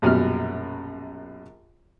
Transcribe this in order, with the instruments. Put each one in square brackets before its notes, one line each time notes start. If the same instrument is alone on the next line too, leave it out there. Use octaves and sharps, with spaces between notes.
[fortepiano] A#1 F#2 B2 G3 F6